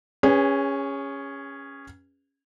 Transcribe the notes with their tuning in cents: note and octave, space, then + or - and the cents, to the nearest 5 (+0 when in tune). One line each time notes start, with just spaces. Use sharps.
C#4 +0 G#4 -30 B4 +0